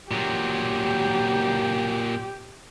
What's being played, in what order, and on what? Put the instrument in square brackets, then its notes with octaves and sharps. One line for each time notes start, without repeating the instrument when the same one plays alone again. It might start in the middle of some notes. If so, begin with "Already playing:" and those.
[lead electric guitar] A#2 F#3 [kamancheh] G4